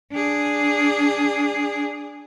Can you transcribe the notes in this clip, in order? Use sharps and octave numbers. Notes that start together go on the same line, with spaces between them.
D4 G#4